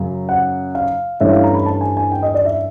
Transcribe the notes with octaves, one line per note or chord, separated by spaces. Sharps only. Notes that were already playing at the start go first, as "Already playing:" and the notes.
Already playing: F#2 C#3 F#3
F#5
F5
G2 E3 A3 C#4 E5
F5
A#5
B5
A5
G#5
G#5
G5
D#5
D5
E5